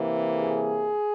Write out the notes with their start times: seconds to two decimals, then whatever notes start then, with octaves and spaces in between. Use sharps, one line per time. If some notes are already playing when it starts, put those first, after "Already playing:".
Already playing: C3 E3 A#3
0.38 G#4